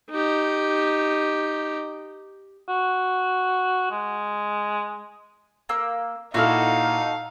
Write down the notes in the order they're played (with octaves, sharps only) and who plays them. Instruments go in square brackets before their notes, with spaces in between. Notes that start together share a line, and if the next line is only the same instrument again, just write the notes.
[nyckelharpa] D#4 G4
[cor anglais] F#4
G#3
[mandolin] A#3 E6
[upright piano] A#2 E4 F6 [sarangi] D#4 [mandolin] F#4 A4 [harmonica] F5